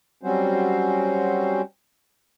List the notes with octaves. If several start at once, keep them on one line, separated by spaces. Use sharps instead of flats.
F#3 G3 C4 C#4 F#4 C5